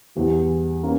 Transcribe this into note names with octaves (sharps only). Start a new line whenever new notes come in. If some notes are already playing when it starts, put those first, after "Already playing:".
E2 E3 G3
A#3 C#4